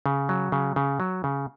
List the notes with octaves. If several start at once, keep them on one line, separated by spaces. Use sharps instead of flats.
C#3
F#3
C#3
C#3
F#3
C#3